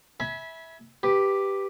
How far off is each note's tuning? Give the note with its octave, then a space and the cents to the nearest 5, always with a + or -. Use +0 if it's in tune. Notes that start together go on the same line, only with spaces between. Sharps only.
E5 -15 G#5 +15 B5 -20
G4 +0 B4 +0